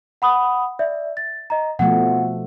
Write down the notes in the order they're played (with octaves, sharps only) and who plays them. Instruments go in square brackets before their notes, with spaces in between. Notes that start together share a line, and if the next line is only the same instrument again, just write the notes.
[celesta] F#5 B5 D#6
D5 E5
A6
D#5 A#5
[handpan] B2 F3 A3 [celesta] F#5